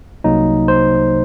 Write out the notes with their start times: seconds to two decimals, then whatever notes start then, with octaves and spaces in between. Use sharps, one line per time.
0.24 C2 C3 F#3 A#3 D#4
0.68 C5